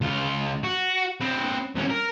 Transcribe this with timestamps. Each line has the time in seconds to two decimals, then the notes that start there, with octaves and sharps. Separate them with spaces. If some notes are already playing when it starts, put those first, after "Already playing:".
0.01 C#2 F4
0.64 F#4
1.21 C4 B4
1.75 C2 C#4
1.90 A#4